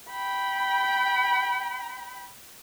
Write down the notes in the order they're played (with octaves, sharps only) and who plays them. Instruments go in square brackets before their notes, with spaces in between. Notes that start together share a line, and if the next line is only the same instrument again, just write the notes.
[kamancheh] G5 B5